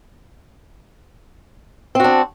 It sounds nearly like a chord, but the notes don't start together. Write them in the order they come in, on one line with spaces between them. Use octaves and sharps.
C4 F#4 D4